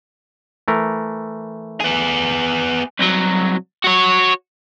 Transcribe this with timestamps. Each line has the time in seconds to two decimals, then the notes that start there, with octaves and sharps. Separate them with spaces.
0.68 E3 A3 A#4
1.80 B3 G#4
2.99 C2 F#3
3.84 F#4 C#5